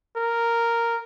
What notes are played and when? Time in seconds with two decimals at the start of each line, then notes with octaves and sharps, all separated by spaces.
0.17 A#4